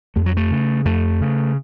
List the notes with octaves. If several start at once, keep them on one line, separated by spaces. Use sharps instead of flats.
F2 A3
F#3
A3
C#3
F2 A3
C#3